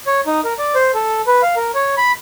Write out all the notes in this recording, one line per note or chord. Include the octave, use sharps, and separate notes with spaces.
C#5
D#4
A#4
D5
C5
A4
B4
F5
A#4
C#5
B5